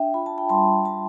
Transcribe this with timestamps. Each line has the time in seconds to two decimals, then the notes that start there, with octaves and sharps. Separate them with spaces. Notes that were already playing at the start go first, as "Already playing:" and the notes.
Already playing: D4 E5 G5
0.14 F4 B5
0.26 A5
0.38 G5 B5
0.49 G3 A5 C6
0.85 G3 A5 C6